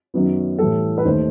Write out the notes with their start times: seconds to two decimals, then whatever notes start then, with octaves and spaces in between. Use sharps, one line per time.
0.14 F#2 D#3 F#3 B3
0.59 A2 E3 G3 A4
0.98 B4
1.05 D#2 D#3 A3 C5